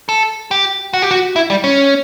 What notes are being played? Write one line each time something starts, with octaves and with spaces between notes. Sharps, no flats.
A4
G4
F#4
G4
F#4
E4
G3
C#4